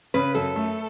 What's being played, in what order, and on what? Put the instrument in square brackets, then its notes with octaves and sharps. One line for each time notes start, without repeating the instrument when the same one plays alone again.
[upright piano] C#3 [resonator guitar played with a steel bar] B4
[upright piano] F#2 [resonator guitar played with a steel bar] A4
[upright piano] A3